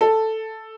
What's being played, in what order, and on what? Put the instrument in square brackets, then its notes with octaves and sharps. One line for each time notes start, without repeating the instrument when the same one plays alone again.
[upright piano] A4